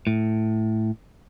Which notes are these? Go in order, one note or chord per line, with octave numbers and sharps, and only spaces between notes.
A2